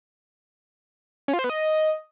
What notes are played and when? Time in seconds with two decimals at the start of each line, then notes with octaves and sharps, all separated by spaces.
1.28 C#4
1.33 F4
1.39 C5
1.44 B3
1.50 D#5